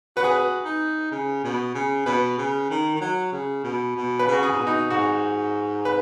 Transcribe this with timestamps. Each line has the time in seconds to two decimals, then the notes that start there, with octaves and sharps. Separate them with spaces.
0.17 F#4 B4
0.24 G#4
0.31 B4
0.65 D#4
1.11 C#3
1.44 B2
1.75 C#3
2.06 B2 B4
2.38 C#3
2.70 D#3
2.95 D#3
3.01 F#3
3.32 C#3
3.64 B2
3.96 B2
4.19 B4
4.28 C#3 F#4
4.43 G#4
4.52 G#2
4.59 B2
4.67 D#4
4.90 G#2 F#4
5.85 B4